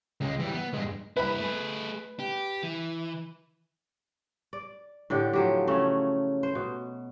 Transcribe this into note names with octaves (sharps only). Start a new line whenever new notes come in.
C#2 G#3
E3 G3
B3
G2 G#3
G2 E4 B4 B5
A3 G#4
G4
E3
D5
A2 D3 G4
F3 F#3 G4
C#3 A3 C#4
C5
B2